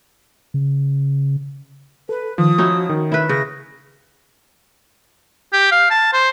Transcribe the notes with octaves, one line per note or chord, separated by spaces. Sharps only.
C#3
A4 B4
D#3 F3 D#6
C#4 D#4 E4 F#4
D#3
E4 B4
C#3 A#6
G4
F5
A5
C5